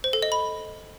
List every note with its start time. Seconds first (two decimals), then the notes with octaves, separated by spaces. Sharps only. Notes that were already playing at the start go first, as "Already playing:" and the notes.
0.04 C5
0.13 A4
0.22 D#5
0.32 B5